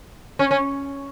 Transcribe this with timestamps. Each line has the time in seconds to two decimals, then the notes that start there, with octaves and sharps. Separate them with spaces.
0.39 C#4
0.51 C#4